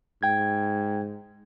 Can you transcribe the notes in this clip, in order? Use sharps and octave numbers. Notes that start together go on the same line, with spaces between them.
G#2 G5 G#6